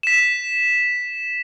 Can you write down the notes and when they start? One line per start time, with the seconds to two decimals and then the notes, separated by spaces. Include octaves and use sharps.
0.03 B6 E7